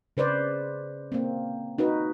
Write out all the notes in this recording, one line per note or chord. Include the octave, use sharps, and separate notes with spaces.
C#3 B4 C5 D5
A#3 C4
D#4 F#4 B4